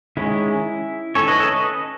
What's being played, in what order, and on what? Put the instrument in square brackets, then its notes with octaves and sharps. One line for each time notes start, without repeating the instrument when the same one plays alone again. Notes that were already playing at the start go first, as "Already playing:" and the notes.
[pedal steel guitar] D#3 G#3 C#4 E4
D#3 A3 C#4 A4 C#5
B4 D#5
A4 C#5
B4 D#5